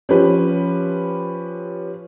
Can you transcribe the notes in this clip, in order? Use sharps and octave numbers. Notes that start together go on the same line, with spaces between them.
F3 C#4 G4 B4